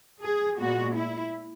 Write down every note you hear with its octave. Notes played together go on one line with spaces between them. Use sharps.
G#4
A#2 G#3 B3 F#4
E4